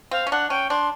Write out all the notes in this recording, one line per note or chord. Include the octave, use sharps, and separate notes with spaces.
C4 F5
C#4
D4 F#5
C#4 G5
D4 C6